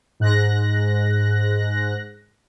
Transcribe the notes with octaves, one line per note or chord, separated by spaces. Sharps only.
G#2 F#6 A#6